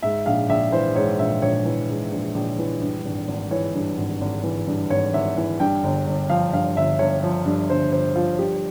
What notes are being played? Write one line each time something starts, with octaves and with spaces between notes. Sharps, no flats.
G#2 E5
A#1 F5
A#1 E5
E3 C5
G#2 C#5
A#1 E5
A#1 C#5
E3
G#2
A#1
A#1
E3
G2
G#1
G#1
E3 C#5
G2
G#1
G#1
E3
G2
G#1 C#5
G#1 E5
E3
G2 G5
G1
G1
F3 F5
G2 F5
G1 E5
G1 C#5
F3
G2
G1 C5
G1 C5
F3 F4
G2 G4